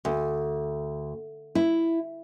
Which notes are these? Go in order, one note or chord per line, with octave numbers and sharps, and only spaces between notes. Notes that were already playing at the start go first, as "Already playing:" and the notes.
D2
E4